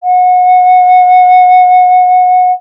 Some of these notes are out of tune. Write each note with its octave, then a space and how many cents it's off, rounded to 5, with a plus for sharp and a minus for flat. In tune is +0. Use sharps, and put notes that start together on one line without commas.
F#5 -25